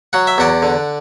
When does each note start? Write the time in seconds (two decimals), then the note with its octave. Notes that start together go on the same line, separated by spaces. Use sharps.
0.13 F#3 F#5
0.27 E5
0.38 E2 D5 F#5
0.62 D3